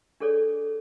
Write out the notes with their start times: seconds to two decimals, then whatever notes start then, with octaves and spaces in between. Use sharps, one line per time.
0.20 D4 G#4 A4 C#5 D5